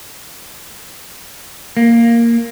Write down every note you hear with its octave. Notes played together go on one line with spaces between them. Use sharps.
A#3